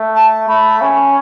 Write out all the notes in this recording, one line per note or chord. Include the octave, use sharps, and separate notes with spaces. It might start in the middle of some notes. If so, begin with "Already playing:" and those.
Already playing: A3
A5
A3 B5
C#4